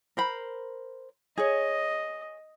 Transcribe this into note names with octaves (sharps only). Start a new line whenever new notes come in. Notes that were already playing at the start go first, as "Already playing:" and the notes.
A#4 C5 B5
G#4 C#5 D#5